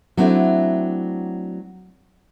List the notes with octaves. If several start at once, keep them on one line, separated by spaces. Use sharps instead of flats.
F#3 A3 C4 D4 E4